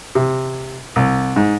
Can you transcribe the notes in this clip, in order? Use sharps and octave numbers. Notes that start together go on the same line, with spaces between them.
C3
C2
G#2